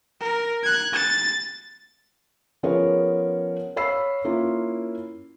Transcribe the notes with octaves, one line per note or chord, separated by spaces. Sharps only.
A#4
F#6 G#6
A6
F3 B3 C#4 G#4 A#4 C#5
C#5 F5 B5 E6 C7
A#3 C#4 E4 F4